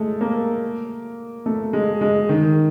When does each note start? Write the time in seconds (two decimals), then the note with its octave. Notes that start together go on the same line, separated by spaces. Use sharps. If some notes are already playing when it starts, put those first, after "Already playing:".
Already playing: G#3 A3
0.21 A#3
1.46 A3
1.73 G#3
2.01 G#3
2.29 D#3